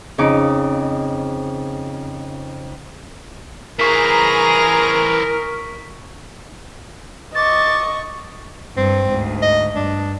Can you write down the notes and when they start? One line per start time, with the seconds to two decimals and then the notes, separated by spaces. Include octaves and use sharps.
0.18 F2 C#3 C#4 D#4 D6
3.79 E3 G#4 A#4 C5 A#5 C#6 B6
7.35 D#5 C#6 D6 A6
8.77 G2 C4
9.07 D2 G#2
9.42 D#5
9.75 G2 D4